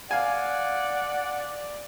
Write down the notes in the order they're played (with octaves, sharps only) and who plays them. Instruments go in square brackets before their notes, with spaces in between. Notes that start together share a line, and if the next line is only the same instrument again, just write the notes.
[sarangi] D5 [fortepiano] F5 G#5 [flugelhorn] F#5